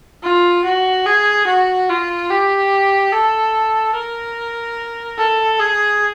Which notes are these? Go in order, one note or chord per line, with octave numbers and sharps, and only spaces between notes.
F4
F#4
G#4
F#4
F4
G4
A4
A#4
A4
G#4